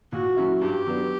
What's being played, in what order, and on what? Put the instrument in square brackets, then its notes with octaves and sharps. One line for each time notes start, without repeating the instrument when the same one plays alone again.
[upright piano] A#2 [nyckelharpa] F#4
[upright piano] F#3 C#4 E4
[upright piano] G2 [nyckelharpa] G4
[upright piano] F#3 B3 D4